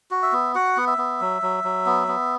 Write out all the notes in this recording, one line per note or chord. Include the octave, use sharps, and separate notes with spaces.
F#4
E5
B3
F#4 F#5
B3
E5
B3
F#3
F#3
F#3
B3
B3